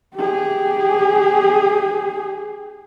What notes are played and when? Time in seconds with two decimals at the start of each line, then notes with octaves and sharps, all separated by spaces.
0.16 G4 G#4